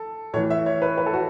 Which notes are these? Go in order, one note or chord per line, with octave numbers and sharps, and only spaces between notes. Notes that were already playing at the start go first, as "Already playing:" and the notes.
Already playing: A4
A2 E3 C#5
E5
C#5
B4
B4
A4
F#4